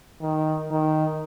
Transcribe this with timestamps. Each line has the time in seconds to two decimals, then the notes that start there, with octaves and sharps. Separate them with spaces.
0.21 D#3
0.71 D#3